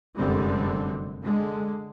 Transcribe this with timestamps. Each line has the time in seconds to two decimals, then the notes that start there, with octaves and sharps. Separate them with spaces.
0.18 F1 F#2 D3 G3 G#3 C4
1.23 D3 G#3